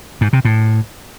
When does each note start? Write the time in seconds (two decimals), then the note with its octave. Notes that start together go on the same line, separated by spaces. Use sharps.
0.21 G#2
0.33 C3
0.45 A2